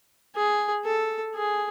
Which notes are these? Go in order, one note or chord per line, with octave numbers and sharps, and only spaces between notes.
G#4
A4
G#4